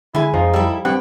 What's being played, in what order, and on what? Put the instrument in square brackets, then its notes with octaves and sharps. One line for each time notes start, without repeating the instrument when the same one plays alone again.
[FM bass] D3 [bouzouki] G#3 G#5 [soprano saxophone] E4
[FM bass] F2 [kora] F3 [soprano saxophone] D#4
[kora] G3 [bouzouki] E4 A4
[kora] G2 [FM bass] C4 [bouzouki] G4 [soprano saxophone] F#5